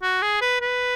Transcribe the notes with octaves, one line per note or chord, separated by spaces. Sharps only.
F#4
G#4
B4
B4